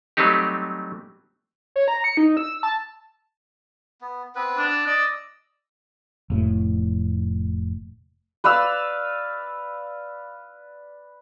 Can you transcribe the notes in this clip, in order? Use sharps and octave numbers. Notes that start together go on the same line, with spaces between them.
F#3 G3 A3 C4 D#4 G4
C#5
A#5
C#7
D#4
E6
A5
B3
B3 C4 B4
D4
E6
D5 D#5 E6
F1 A2
B4 D5 F5 E6